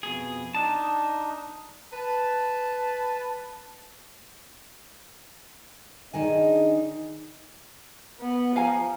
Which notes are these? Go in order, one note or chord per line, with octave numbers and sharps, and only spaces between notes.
F2 B2 G#4
D4 D#4 A5
B4 A5
D#3 D4 D#4 G#4 D#5 G#5
B3
F3 F5 G#5 A#5